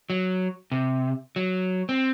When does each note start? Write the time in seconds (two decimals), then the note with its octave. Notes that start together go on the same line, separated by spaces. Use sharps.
0.10 F#3
0.72 C3
1.36 F#3
1.89 C4